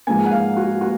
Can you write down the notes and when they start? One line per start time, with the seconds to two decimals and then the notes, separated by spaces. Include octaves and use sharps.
0.07 G#2 F3 A#3 G#5
0.26 F#5
0.31 F5
0.57 F#4
0.81 A#3 F#4